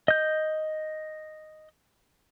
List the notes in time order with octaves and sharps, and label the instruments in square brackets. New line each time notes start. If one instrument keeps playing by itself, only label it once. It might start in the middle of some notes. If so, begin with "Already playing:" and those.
[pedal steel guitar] D#5 G6